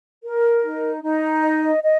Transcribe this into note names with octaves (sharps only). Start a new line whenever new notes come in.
A#4
D#4
D#4
D#5
D#5